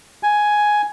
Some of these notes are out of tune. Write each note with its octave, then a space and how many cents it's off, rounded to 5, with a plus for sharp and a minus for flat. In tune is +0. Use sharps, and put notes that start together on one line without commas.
G#5 +5